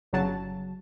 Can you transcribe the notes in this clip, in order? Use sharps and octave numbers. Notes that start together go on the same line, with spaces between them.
G1 C#3 F#3 A5